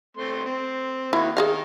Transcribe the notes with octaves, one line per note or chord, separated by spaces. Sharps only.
A3 C4 C6
C4
D#3 A#3 E4 F#4
D#3 G#4 D#5 F5